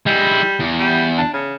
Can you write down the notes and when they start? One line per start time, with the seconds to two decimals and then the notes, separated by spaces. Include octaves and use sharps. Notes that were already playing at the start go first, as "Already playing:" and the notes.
0.07 G3 G#3 E4
0.60 E2
0.80 G3
1.17 D4
1.33 C#3